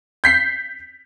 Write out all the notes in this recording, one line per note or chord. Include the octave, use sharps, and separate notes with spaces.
G6 B6 C7